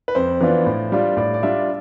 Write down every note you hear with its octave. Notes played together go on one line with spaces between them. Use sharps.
B4
F2 C5
E3 B3 D4 F4
A2
G3 D4 F4
A2 D5
D5
G3 D4 F4 E5